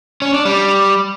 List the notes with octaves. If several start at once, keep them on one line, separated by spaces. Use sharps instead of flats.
C#4
D4
G3